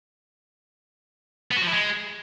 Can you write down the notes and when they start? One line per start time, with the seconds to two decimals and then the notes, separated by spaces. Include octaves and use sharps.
1.51 B3
1.57 F#4
1.62 F3
1.67 E4
1.72 G#3